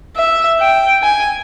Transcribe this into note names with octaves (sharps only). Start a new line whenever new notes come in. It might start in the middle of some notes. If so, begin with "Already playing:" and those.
E5
G5
G#5